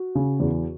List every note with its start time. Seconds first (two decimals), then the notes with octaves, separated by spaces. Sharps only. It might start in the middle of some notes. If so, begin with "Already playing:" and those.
Already playing: F#4
0.15 C#3
0.40 E2